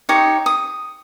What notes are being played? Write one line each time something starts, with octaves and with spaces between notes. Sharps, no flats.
D#4 G4 C#5 D#6
D#6